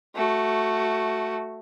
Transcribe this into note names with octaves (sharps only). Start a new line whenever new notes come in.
A3 F#4